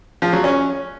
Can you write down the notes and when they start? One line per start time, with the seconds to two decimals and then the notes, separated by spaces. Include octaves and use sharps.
0.22 F3
0.33 F#3
0.44 C#4